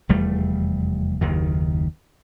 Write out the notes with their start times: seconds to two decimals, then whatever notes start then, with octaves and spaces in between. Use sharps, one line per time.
0.09 F1 E2 G3 A3
1.21 F#1 D#2 D#3